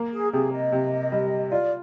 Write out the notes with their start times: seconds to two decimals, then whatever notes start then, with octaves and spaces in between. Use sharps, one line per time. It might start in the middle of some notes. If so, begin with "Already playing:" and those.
Already playing: A#3
0.12 G#4
0.32 C3 G#4
0.52 D#5
0.72 C3
1.12 G3
1.51 F4 D5